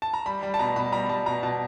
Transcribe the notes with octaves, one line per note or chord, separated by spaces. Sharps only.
A5
A#5
G3 B5
G3
A5
B2 A#5
B2 B5
G3 A#5
G3 A5
B2 A#5
B2 A5